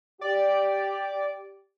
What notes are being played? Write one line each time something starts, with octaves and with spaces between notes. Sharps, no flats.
G4 D5